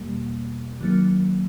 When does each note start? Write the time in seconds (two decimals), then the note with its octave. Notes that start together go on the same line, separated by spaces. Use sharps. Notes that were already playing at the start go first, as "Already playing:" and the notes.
Already playing: E2 B2 G3 A#3
0.81 D#3 F#3 A#3